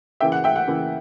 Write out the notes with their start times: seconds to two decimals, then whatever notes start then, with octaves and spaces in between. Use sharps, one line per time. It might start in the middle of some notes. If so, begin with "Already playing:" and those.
0.20 C#3 E3 A#3 E4 E5 G5
0.32 F#5
0.44 E5 G5
0.56 F#5
0.67 C#3 E3 A#3 E4